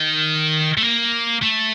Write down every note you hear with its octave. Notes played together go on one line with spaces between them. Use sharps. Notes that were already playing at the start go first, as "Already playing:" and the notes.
Already playing: D#3
A3
A#3
A3